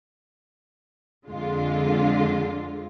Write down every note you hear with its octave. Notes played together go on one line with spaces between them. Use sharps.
F2 D3 G#3 F4